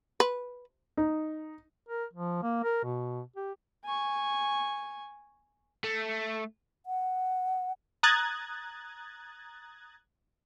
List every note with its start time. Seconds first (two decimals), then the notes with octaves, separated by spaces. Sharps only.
0.20 B4
0.97 D#4
1.89 A#4
2.13 F3
2.43 A#3
2.64 A#4
2.84 B2
3.36 G4
3.85 G#5 C#6
5.84 A3
6.86 F#5
8.03 A#5 D#6 F#6 G#6 A6